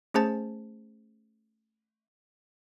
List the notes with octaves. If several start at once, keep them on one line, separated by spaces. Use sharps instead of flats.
A3 C#4 G#4 C5 A5 A6